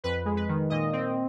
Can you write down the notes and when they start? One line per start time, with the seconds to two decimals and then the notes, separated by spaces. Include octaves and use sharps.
0.04 F2 B4
0.25 G#3
0.37 B4
0.49 D#3
0.70 A#2 D#5
0.93 C4